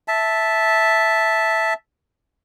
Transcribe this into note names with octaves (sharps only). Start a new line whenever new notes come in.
E5 A5